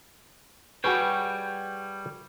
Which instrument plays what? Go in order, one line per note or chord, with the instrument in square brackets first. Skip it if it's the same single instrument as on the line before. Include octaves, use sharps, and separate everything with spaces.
[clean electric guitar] G3 C#5 G5 [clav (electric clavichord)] F#4 G#4 B4